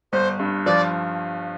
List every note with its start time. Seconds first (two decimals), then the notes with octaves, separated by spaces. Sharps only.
0.12 G1 C5
0.39 G2
0.66 F3 D5